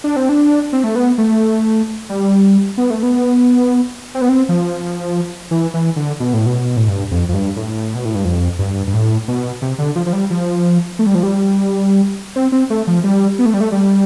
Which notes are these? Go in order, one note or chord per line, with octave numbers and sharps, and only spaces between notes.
D4
C4
D4
C4
A3
B3
A3
G3
B3
A3
B3
C4
B3
C4
F3
E3
E3
D3
B2
A2
B2
A2
G2
F2
F2
G2
A2
B2
A2
G2
F2
G2
G2
A2
B2
C3
D3
F3
F3
G3
F3
A3
G3
F3
G3
C4
C4
A3
F3
G3
B3
A3
G3
A3
G3